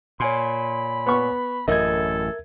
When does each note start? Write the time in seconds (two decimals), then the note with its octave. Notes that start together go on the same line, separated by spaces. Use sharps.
0.20 A#2 C#5 G#5 B5 C6
1.07 B3 C#6
1.68 A1 F#2 A4 A#4 D#5 E5 G#6